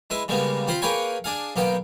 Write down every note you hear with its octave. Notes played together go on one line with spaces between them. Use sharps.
G#3 E4 B4
C#3 G3 G#3 A#3 B3
C4 F4 C5 B5
A#3 G#4 B4 C#5 G5 G#5
D4 G#4 F5
B1 A#3 B3 G5